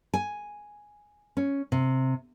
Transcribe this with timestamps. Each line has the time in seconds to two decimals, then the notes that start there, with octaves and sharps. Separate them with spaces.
0.14 G#5
1.37 C#4
1.72 C3